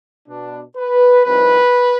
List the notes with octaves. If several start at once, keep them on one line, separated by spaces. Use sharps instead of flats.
B2 B3 D4
B4
C2 C3 F3 C4 D#4 B4